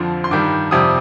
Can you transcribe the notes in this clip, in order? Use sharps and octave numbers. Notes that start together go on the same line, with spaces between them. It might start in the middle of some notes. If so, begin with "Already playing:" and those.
Already playing: F2 D3 F3 C6
C6
G2 D#3 G3 D6
F2 C3 G3 D#6